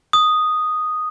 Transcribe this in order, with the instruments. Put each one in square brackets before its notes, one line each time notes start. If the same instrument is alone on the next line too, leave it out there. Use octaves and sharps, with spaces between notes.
[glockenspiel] D#6